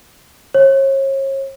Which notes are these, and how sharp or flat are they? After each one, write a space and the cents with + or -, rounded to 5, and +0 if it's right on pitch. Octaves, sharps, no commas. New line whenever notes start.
C#5 -40